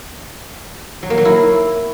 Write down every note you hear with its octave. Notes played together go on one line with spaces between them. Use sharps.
F#3
A#3
F#3
E4